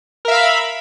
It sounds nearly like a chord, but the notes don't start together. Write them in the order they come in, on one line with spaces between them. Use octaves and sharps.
A#4 E5 F5 B5